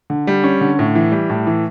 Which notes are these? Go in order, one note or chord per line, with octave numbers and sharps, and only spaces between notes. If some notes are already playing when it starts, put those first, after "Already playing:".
D3
G3
C#4
D3
A2
E3
G3
A2
E3